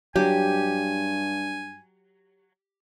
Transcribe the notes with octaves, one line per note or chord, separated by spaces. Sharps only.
G2 F#3 G4 G#5